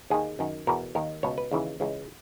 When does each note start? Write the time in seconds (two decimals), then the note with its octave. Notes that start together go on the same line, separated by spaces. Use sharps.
0.10 D#2 D#3 G#4
0.39 F#2 D#3
0.67 E2 B2 A#4
0.95 D#2 D#3 A#4
1.23 C#2 B2 C#5
1.38 B4
1.51 D#2 C#3 E3
1.80 C#2 C#3 E3